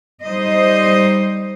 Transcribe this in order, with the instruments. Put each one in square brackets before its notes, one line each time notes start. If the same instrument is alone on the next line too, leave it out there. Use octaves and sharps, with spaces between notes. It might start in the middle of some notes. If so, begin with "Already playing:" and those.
[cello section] G3 D#4 C5 D#5